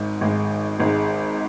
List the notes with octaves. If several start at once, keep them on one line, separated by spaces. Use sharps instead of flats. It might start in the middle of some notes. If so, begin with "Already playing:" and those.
Already playing: G#1 G#2 G#3
G#1 G#2 G#3
G#1 G#2 G#3